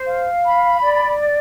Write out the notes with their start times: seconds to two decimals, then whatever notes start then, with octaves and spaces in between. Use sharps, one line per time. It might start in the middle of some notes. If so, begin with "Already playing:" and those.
Already playing: C5
0.08 F5
0.45 B5
0.82 D5